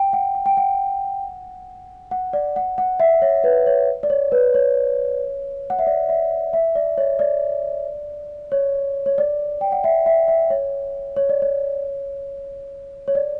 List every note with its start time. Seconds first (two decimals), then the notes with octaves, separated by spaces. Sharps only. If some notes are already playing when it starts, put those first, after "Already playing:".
Already playing: G5
0.13 F#5
0.35 G5
0.46 G5
0.57 F#5
2.11 F#5
2.33 D5
2.56 F#5
2.78 F#5
3.00 E5
3.22 C#5
3.44 B4
3.67 C#5
4.03 D5
4.10 C#5
4.32 B4
4.54 C#5
5.70 F#5
5.79 E5
5.87 D5
6.09 E5
6.53 E5
6.75 D5
6.98 C#5
7.19 D5
8.52 C#5
9.06 C#5
9.18 D5
9.61 G5
9.72 F#5
9.84 E5
10.06 E5
10.28 E5
10.50 C#5
11.16 C#5
11.29 D5
11.42 C#5
13.08 C#5
13.15 D5